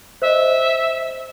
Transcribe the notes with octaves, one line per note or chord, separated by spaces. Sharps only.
C5 D#5 E5